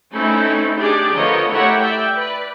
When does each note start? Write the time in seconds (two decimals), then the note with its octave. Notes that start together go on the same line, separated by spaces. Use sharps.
0.13 A3 C4 C#4 D#4 E4 A4
0.78 D4 D#4 G4 G#4 D5
1.13 D3 F3 B3 A#4 C#5 D#5
1.49 A3 E4 G4 A#4 C#5 F#5
1.80 D5 E5 G5
2.14 B4 D5